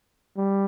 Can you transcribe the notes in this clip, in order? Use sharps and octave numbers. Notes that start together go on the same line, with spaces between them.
G3